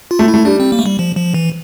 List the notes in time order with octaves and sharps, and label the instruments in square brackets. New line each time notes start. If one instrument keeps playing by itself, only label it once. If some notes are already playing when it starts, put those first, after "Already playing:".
[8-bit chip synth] F4
[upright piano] A3
[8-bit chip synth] E4
[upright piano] A3
[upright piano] G3 [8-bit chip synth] D4
[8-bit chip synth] C4
A#3
A3
G3
F3
F3
E3